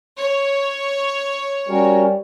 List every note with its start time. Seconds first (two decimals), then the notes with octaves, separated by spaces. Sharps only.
0.19 C#5
1.69 G3 C#4 F#4 A#4